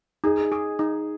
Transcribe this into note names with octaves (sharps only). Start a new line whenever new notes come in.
D#4 G#4
G#4
D#4